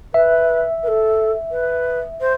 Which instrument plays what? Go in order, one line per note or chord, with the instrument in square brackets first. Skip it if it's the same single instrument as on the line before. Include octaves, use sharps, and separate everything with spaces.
[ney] B4 [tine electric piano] E5
[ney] B4
A4
B4
C5